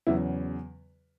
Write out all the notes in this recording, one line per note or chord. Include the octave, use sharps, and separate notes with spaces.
E2 C#3 F#3 E4